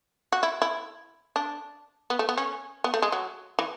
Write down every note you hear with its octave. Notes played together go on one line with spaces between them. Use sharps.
F#4
E4
E4
D4
B3
A3
B3
C#4
B3
A3
G#3
F#3
E3